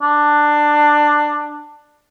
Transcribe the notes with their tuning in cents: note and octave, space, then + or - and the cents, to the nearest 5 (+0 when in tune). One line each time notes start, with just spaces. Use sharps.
D4 +15